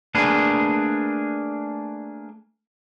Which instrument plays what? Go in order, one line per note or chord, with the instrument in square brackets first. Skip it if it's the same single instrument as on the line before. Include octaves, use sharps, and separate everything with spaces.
[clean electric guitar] A3 A#3 D4 G#4 B4